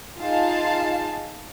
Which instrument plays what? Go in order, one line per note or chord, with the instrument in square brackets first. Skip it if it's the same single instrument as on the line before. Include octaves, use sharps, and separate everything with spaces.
[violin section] D#4 F4 G#4 F5 A5